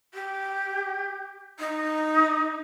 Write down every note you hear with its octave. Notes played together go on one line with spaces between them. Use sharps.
G4
D#4